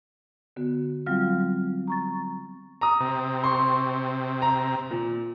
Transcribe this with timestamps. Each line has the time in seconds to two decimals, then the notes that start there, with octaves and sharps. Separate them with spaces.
0.56 D3 B3 F#4
1.06 F#3 G3 C4 F4 F5 F6
1.88 A#5 C#6 A6
2.81 A#5 D#6
3.00 C3
3.44 C6 C#6
4.42 A#5
4.91 A#2